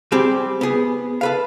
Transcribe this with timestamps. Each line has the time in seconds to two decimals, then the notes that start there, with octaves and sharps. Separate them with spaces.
0.12 G3 C4 G4 G#4
0.61 B3 G#4
1.21 A4 B4 F5